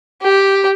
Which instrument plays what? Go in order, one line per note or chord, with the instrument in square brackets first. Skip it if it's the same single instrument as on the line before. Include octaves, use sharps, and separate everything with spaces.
[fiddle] G4